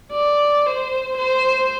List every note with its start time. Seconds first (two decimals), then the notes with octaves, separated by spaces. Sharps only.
0.13 D5
0.65 C5
1.17 C5